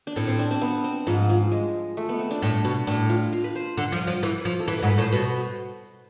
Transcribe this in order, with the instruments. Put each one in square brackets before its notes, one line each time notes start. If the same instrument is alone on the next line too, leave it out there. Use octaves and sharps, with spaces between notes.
[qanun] D4
[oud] A2 [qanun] C4
[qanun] C4
D4
C4
B3
C4
[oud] G#2 [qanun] F3
[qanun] F3
G#3
A3
B3
C4
D4
[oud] A2
B2
[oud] A2 [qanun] D4
[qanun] F4
F4
B4
C5
[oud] D3
F3
F3
E3
F3
[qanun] A4
[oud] E3 [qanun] B4
[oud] G#2 [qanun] B4
[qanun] B4
[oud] A2
[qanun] C5
[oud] B2 [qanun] B4